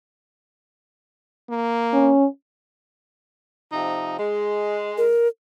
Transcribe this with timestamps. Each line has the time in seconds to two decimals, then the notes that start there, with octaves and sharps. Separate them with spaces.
1.49 A#3
1.93 C#4
3.72 C3 F3 D#4
4.18 G#3
4.98 A#4